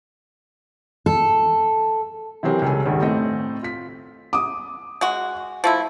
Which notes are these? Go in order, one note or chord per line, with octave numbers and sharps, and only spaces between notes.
A4
C3 E3 F#3 C4 G4 A#4
C#2 G3 C#4 A4 G#5
D#1 G#1 G2 G3
A2 A3 C4 D#5
F4 B6
D6 D#6
G#3 F#4
F3 A3 E4